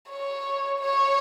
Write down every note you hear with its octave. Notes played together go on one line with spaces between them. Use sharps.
C#5
C#5